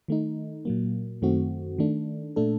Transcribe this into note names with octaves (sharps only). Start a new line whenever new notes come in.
D#3 A3 D#4
A#2 F#3 A#3
F#2 D#3 A3 C4 F#4
D#3 A3 D4
A#2 A3 D4 A4